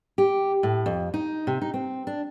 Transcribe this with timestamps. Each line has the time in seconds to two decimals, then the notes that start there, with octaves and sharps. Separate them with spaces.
0.18 G4
0.63 A2
0.86 F2
1.14 D#4
1.47 C3
1.62 D#4
1.74 C4
2.07 D4